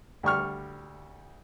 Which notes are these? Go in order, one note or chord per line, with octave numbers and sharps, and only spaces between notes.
D2 G3 C#6 F6